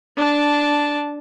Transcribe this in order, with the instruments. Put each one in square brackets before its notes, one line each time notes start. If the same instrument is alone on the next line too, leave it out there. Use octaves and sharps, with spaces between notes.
[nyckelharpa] D4 A5